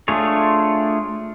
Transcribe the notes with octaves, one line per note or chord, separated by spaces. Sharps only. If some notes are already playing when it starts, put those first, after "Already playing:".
A3 D4 F4 G#4 C#5